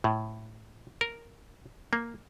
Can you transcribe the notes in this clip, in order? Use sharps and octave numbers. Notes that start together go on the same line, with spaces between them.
A2
A#4
A#3